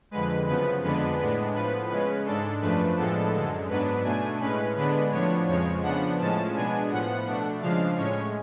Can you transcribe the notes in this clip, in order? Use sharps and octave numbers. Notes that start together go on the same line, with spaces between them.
F2 D3 G#3 B4
F#2 C#3 F3 B3 B4
F2 D3 G#3 B3 D4 B4
A2 G#3 B3 D4
A2 F3 B3 B4
C#3 G#3 C#4 B4
G#2 G#3 D4 A4
F#2 F3 A3 D4 B4
A2 F3 G#3 B3 D4 A4
F#2 D3 G#3
G#2 F#3 B3 D4 B4
B2 A3 D4 G#5
A2 G#3 C#4 B4
D3 G#3 B3 D4 B4
A2 F3 B3 D4 C#5
F2 C#3 F3 G#3 C#5
C#3 F3 B3 D4 F#5
A2 F3 G#3 C#4 A5
B2 G#3 B3 D4 G#5
A2 F3 B3 F#5
B2 A3 D4
C#3 F3 G#3 D4 F5
A2 G#3 C#4 C#5